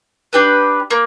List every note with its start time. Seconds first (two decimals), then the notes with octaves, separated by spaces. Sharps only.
0.33 D4 G4 B4
0.91 A#3